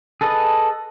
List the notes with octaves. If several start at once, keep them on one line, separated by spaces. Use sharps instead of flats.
G#4 A4 B4 D#5